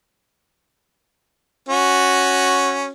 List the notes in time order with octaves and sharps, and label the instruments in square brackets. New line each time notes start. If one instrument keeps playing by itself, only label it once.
[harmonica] C#4 F#4